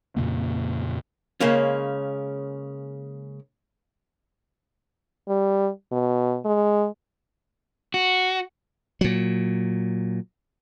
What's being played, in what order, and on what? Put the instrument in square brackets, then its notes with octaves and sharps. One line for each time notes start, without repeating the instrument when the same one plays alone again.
[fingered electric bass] F2 A#2 C#3 A#3
[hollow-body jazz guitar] C#3 G#3 A#3 C#4
[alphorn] G3
B2
G#3
[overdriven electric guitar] F#4
[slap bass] A#2 F#3